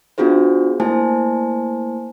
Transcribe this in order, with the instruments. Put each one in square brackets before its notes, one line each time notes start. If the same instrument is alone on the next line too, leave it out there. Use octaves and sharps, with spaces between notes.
[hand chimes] B3 D4 F4 F#4 G#4 C5
A3 A#3 E4 C5 G#5 A5